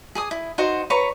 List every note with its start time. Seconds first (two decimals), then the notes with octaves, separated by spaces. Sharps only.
0.15 G#4 G#5 D#6
0.31 E4
0.58 D#4 F#4 C5 F#5
0.90 B4 C#5 A#5 C#6